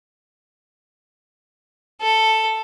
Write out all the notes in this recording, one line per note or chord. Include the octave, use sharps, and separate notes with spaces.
A4